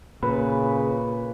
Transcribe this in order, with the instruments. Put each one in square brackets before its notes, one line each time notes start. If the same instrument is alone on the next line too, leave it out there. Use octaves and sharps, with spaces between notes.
[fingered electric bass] A#2 [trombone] C#3 [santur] B4